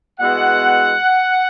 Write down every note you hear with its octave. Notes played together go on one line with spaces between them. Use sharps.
B2 G#3 B3 E4 F#5